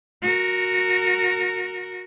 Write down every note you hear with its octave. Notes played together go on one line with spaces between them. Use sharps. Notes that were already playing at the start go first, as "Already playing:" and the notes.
F#4 A#4